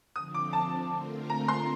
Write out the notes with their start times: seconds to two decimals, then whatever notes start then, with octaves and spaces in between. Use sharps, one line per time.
0.15 D3 F3 C4 D#6
0.34 D6
0.53 A5
0.91 D3 A3 C4 F4 A#4
1.30 A#5
1.48 C6